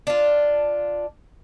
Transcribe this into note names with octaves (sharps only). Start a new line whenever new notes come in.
D4 F4